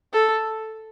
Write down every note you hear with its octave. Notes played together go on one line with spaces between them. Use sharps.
A4